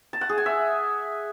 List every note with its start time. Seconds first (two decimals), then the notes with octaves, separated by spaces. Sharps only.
0.13 A5
0.21 F#5
0.29 G#4
0.38 G#5
0.46 E5